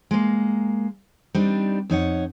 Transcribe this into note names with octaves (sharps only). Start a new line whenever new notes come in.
G#3 A#3
G3 C4 D4 D#4
F2 D#4 C#5 F#5